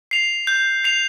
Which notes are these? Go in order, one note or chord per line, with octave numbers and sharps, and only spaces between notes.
C7 F7
G6
C7 F7